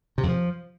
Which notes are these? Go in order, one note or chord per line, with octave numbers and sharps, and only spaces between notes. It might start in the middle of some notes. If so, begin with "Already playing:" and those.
C3
F2
F3